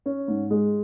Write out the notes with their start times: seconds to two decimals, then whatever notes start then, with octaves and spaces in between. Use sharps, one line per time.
0.06 C#4
0.28 G#2
0.50 G#3